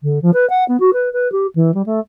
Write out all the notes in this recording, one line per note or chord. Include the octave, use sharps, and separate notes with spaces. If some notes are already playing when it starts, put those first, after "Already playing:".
D3
F3
B4
F#5
B3
F#4
B4
B4
G4
E3
G3
A3